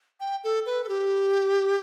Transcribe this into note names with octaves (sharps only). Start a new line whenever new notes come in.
G5
A4
B4
A4
G4